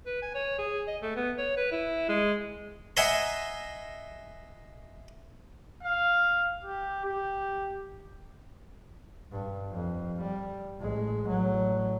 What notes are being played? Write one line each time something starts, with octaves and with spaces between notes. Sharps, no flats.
B4
G#5
C#5
G#4
D#5
A3
B3
C#5
B4
E4
G#3
D#5 E5 F#5 G#5 A#5 C6
F5
G4
G4
G2
F2
G3
A1 G#3
A1 F#3